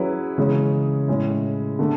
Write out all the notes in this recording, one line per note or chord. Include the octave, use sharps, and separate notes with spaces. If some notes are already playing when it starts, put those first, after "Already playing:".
Already playing: F#3 C#4 E4 G#4 B4
C#3 E3 G#3 C#4 G#4
A2 G#3 C#4 E4
D3 A3